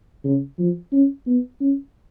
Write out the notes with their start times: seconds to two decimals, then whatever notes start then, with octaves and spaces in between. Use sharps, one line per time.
0.25 C#3
0.59 F3
0.92 C#4
1.26 B3
1.60 C#4